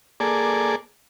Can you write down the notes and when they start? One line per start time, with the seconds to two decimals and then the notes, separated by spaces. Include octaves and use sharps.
0.20 A#3 G#4 A4 D5